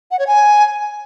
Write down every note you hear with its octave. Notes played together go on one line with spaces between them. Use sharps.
F#5
C#5
G#5